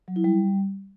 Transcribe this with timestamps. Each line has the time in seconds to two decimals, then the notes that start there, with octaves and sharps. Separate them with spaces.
0.08 F#3
0.16 E4
0.24 G3